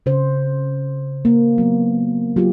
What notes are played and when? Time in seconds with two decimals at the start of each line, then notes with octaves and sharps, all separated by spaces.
0.06 C#3 C5
1.25 A#3
1.58 F#3 B3
2.36 F#3 F4 G4